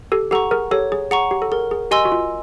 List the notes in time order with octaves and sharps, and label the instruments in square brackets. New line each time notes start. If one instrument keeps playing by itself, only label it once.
[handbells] G4 A4
[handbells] G4 A4 [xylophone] F#5 A#5 C#6
[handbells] G#4 A#4
[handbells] G4 A4 [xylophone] C#5
[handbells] G#4
[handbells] G#4 [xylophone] F#5 A#5 C#6
[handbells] G4
A4
[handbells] G#4 [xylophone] A#4
[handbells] G#4
[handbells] G4 [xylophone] D#5 G#5 C6 E6
[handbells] F#4
F4